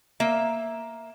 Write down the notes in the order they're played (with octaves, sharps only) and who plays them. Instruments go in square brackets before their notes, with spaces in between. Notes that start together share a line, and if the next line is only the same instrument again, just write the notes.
[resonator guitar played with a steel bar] A#3 E5